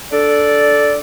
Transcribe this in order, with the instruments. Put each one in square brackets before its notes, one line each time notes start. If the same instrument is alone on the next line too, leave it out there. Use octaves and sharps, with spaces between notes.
[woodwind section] D4 A4 D5